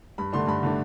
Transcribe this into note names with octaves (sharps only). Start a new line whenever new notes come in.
G2 B5
D3 A3 D4 C6
G2 B5
D3 A3 D4